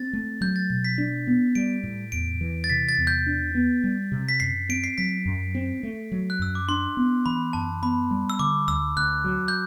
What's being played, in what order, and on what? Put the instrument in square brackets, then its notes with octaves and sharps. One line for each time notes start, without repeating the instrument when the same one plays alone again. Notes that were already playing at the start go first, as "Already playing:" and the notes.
Already playing: [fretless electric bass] C4 [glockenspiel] A6
[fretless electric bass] A3
[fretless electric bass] F#3 [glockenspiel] G6
[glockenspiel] A6
[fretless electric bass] B2 [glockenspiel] A6
[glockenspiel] B6
[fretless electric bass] D4
B3
[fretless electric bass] G3 [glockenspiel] D7
[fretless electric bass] A2
[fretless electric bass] E2 [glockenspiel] D7
[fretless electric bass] E3
[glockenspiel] A6
[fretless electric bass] C3 [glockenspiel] B6
[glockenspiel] A6
[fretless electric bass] E2
[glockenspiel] G6
[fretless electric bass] D4
B3
G3
C3
[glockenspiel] B6
[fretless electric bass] F#2 [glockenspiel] C7
[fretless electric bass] C4 [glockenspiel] D7
[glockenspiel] C7
[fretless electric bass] F#3 [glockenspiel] B6
[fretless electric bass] F#2
C4
A3
F#3
[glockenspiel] F#6
[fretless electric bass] F#2 [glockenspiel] E6
[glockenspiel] D6
[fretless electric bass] D4 [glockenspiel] C6
[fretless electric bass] B3
[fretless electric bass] E3 [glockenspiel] B5
[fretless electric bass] F#2 [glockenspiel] A5
[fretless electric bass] B3 [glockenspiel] B5
[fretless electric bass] G3
[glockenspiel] E6
[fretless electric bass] D3 [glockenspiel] D6
[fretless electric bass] D2 [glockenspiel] E6
[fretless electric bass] D2 [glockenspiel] F#6
[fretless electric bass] F#3
[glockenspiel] G6